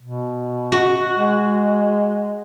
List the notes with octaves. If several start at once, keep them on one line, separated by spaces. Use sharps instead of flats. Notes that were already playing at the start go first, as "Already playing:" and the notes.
B2
F#4
G#3